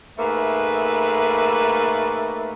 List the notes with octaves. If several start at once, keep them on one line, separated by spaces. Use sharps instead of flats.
G#2 A3 A#3 B4 E5